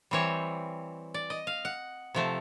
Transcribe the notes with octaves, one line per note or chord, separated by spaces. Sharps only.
E3 G3 C4 C#5
D5
D#5
F5
F#5
C3 F3 A3